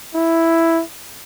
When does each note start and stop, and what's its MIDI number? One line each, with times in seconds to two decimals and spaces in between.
0.15 0.82 64